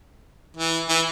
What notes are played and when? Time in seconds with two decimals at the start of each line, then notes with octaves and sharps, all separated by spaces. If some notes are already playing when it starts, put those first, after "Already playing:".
0.57 E3
0.89 E3